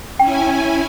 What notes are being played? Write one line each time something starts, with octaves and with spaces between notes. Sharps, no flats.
C#4 E4 G5 G#5